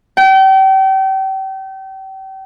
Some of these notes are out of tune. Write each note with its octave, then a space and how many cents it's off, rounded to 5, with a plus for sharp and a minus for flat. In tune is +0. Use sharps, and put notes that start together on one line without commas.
G5 -35